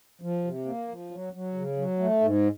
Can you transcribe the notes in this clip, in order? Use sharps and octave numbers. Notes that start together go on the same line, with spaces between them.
F3
C3
A#3
F3
F#3
F#3
C#3
F#3
A3
G#2